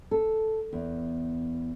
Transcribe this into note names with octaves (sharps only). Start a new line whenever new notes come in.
A4
E2